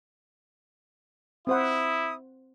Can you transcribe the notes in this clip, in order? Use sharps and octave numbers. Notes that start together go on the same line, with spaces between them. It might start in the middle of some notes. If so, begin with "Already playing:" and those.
C4 E4 C5 F#5 D#6